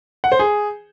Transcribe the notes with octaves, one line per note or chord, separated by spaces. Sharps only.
F#5
C5
G#4